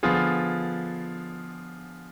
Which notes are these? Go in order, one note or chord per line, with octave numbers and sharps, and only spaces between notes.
D3 F3 B3 F4 G#4